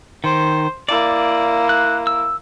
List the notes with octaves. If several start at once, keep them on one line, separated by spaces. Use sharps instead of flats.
D#3 C5
A#3 E4 D5
F#6
E6